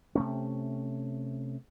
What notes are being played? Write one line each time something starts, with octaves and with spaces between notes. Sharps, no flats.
C3 A3 C#4